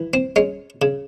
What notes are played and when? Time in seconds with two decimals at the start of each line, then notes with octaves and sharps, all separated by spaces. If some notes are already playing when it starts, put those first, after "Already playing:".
Already playing: E3
0.14 C4
0.36 G#3 C#4
0.82 C#3